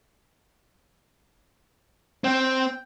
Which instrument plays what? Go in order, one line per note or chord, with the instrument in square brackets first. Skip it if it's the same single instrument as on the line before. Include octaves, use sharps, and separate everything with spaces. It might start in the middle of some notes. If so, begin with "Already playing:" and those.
[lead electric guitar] C4 [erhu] G5